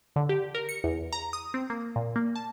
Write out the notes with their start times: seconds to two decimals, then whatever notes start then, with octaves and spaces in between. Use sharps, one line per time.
0.16 D3
0.29 G4
0.55 A#4
0.69 C#7
0.84 E2
1.13 A#5
1.33 D#6
1.54 C4
1.70 A#3
1.96 A#2
2.16 A#3
2.36 A5